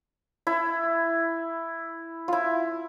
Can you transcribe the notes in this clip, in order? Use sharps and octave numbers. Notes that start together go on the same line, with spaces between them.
E4
E4 F4